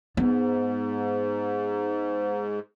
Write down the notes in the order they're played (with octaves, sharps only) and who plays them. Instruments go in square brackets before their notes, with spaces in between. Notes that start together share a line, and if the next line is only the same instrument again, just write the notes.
[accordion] G#2 [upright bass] B3